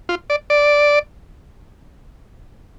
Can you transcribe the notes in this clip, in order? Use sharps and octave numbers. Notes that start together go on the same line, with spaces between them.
F4
D5
D5